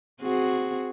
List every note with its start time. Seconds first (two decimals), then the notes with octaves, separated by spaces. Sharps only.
0.22 C4 F#4 G#4